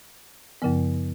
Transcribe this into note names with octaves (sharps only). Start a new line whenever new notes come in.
F#2 C#3 F3 B3